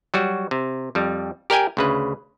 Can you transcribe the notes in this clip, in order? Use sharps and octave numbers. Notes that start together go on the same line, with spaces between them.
F#3 G3 F#4
C3
F2 G3
G4 A#4 D5 G5 G#5
D2 C#3 B4